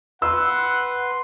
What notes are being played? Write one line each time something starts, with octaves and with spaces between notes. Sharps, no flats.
B4 F#5 C6 E6